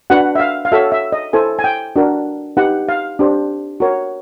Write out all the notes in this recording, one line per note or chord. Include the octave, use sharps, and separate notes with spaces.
D4 F#4 B4 F#5
E5
F5
F5
F#4 A4 C#5 E5
E5
D#5
E4 A4 C5 G#5
G#5
G5
D4 F#4 A#4
D#4 G4 B4 F#5
F5
D4 G4 C5
F#4 A#4 C#5